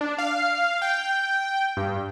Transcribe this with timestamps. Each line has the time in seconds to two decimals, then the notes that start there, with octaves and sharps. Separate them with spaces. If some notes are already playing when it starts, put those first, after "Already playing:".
0.01 D4
0.18 F5
0.82 G5
1.77 G2